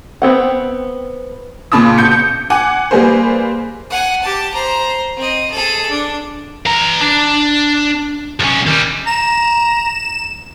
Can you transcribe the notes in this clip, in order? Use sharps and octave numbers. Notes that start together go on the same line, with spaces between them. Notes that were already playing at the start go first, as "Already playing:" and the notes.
B3 C4 F#5
A#2 C#3 A5 B5 D#6
B2 G6 C#7
G6
F#5 G#5 D6
G3 A#3 G#4 B4 C5
F#5 G#5
G4 A5
C5 A#5
C4 D#5
G#4 A4
D4
E3 A#5
D4
B1 C#4
D#3 G3
A#5 E7